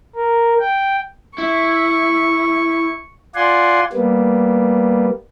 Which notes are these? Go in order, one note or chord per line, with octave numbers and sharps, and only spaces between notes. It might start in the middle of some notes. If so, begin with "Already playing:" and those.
A#4
G5
E4 C#6
F4 D5 F#5 G#5 C6
G3 A#3 B3